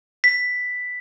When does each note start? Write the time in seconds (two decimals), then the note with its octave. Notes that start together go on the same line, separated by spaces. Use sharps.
0.24 B6